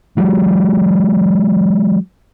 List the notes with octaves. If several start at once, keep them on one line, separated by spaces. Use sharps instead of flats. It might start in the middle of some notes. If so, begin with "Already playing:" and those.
E3 F#3 G#3